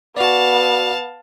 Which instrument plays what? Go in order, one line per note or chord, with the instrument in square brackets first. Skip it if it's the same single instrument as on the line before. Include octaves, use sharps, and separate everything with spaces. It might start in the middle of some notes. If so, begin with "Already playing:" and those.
[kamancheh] B3 [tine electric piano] F#4 D5 [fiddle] F5 A5